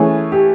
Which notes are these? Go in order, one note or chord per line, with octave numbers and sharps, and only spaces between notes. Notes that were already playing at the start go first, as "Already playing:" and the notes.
Already playing: E3 A3 C#4 G#4
G4